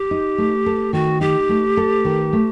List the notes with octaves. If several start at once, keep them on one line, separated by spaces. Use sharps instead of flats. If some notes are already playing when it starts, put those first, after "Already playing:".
Already playing: G4
D#4
A3
A4
D#3 F#4
D#4 G4
A3
A4
D#3
A3